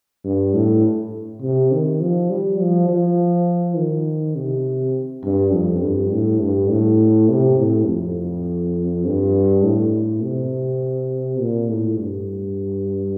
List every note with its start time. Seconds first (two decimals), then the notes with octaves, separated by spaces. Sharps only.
0.25 G2
0.54 A2
1.42 C3
1.72 D#3
2.01 F3
2.30 G3
2.59 F3
2.89 F3
3.77 D#3
4.36 C3
5.24 G2
5.53 F2
5.82 G2
6.12 A2
6.41 G2
6.71 A2
7.29 C3
7.59 A2
7.88 F2
9.06 G2
9.64 A2
10.23 C3
11.40 A#2
11.70 A2
11.99 G2